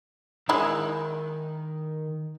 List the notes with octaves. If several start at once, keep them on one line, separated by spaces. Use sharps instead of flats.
D#3 G#3 E4 G#4